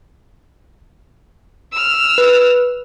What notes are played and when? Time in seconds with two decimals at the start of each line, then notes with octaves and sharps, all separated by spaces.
1.73 E6 F6
2.18 B4